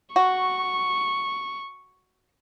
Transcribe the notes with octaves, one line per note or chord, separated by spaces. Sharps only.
F#4 C#6